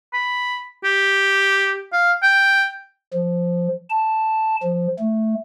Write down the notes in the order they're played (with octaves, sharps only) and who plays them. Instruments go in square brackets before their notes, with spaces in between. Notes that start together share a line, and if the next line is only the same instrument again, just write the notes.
[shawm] B5
G4
F5
G5
[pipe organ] F3
A5
F3
A3